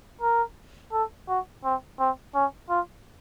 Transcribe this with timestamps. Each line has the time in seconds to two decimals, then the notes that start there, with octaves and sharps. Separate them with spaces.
0.21 A#4
0.93 A4
1.28 F#4
1.64 C4
1.99 C4
2.35 C#4
2.70 F4